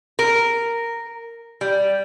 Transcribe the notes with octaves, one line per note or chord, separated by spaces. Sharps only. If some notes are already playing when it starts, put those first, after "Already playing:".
A#4
G3